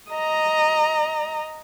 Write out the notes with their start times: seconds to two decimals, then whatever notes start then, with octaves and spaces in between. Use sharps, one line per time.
0.11 D#5 A#5